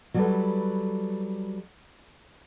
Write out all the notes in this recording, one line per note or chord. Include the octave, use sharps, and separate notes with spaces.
F#3 G3 F#4 G4 A4 B4